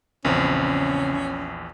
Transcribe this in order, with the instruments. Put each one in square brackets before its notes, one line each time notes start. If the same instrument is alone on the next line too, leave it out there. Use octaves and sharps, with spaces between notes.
[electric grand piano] A#1 E2 [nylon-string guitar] C#3 C4 [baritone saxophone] C#4